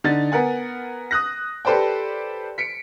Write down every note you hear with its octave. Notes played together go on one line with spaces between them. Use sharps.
D3 D#4 A6
B3 A#4 F#5 G#5
D#6 F#6 A#6
G4 A4 B4 C5 D5 G5
B6 C#7 D7